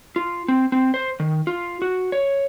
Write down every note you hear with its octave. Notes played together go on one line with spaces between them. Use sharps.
F4
C4
C4
C5
D#3
F4
F#4
C#5